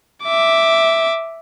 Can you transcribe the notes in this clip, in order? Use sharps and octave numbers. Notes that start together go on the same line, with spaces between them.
E5 D6